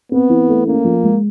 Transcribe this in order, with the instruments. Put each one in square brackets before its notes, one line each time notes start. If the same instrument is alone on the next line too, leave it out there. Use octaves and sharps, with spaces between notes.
[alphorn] B3 [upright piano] C4
[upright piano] E3
A3
[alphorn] A#3 [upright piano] C#4
[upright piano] F3
G#3